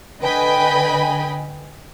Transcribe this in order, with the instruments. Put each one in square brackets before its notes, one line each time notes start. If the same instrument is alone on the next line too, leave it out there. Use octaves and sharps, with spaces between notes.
[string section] D3 B4 D#5 G5 G#5 B5